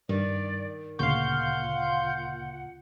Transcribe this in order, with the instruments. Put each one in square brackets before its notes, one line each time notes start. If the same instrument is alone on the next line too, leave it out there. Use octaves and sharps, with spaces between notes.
[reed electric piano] G2 [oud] D#3 [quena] D5
[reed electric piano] D2 C#3 C#6 [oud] A#2 [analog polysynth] F5 C6 G6 [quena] F#5